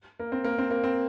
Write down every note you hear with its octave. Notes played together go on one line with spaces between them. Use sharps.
A#3
C4
A#3
C4
A#3
C4